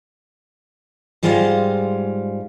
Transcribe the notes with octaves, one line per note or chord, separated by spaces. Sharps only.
G#2 G3 G#3 F4 C5 F5